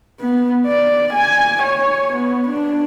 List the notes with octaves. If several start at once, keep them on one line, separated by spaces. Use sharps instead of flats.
B3
D5
G#5
C#5
B3
D4